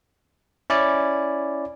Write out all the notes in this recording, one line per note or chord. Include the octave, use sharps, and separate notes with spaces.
C#4 E4 D5